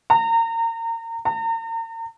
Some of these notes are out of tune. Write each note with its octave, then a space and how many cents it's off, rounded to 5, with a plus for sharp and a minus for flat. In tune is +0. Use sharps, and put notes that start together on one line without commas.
A#5 -30
A#5 -40